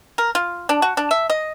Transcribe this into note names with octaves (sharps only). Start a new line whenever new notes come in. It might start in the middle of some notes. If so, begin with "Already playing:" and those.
A#4
F4
D4
F#4
D4
E5
D#5